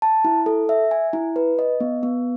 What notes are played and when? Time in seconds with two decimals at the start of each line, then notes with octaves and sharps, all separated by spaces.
0.02 A5
0.25 E4
0.46 A4
0.69 E5
0.91 G#5
1.13 E4
1.36 B4
1.59 D#5
1.81 B3
2.03 B3